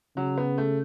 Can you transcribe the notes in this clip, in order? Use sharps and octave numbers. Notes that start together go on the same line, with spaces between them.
C#3 F#3
B3
A3